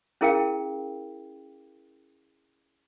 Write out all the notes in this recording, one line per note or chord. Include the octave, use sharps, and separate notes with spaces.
C#4 E4 G#4 A#4 F5 G5